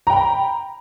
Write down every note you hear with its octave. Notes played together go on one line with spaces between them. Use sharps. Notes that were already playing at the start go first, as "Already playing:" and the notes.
G5 A#5 B5